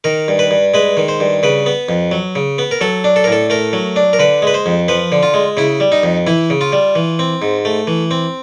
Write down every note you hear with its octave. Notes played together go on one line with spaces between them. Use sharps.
D#3 A#4
G2
B4
G2
G#3 B4
D#3
C5
G2
C#3 B4
B3
F2
F#3
C#3
B3
A#4
F#3 A4
D4
A4
A#4
A2 A4
A3 A#4
F#3
D4
A#4
D3 B4
G#3 B4
C5
F2
F3 B4
D3
F4
G#3
C#3 E4
G3
D#4
F2
E3 E4
C#3
F4
G3
E3
C4
G#2
A3
E3
C4